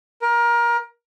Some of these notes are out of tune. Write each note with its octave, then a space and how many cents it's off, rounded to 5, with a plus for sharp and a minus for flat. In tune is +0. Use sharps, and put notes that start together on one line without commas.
A#4 +25